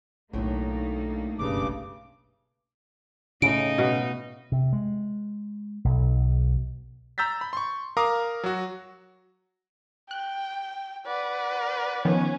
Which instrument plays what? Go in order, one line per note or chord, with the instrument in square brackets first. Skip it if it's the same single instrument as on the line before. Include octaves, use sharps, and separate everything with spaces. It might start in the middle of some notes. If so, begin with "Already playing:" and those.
[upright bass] B1 E4 [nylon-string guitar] A2 D3 F#3 [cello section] A3 A#3 D#4
[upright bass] F#1 B1 [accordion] G2 C#3 D6
[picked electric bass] A2 C#3 [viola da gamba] D#4 [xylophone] D7
[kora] B2
[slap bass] C3
G#3
B1
[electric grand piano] A#5 E6 G6 A6 B6
B5
C6 C#6
A#4 F5 A#5 D6 D#6
F#3 F#4
[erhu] G5 [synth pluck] F#6
[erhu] B4 [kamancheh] D5 F#5
[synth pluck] D#3 F3 B3 [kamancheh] C#4 C#5